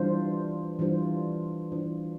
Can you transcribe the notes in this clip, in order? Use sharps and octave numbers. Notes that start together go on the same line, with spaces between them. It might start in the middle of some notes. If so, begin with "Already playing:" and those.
Already playing: E3 G3 D4 F4 C5
E3 G3 D4 F4 C5
E3 G3 D4 F4 C5